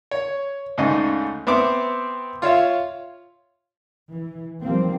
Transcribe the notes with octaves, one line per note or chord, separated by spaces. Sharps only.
C#5
D2 G#2 C#3 D#4 D#5
B3 C4 E5 D6
F4 C#5 E5 F5
E3
D#3 F3 G3 A#3 C4